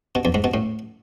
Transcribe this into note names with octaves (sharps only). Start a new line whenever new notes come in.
B2
E2
G#2
B2
A2